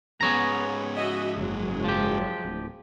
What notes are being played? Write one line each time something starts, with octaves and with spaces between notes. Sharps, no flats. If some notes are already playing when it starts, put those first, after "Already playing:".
G#2 B3 C#4 G#4 C#5 A#5
F#4 D#5 E5
F#1 F#3 G#3
F3 G4
D1